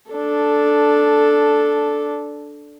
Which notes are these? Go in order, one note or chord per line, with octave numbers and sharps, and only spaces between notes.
D4 A4